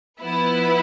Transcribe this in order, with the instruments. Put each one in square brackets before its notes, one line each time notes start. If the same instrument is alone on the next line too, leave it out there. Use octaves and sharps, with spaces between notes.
[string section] F3 B3 E4 B4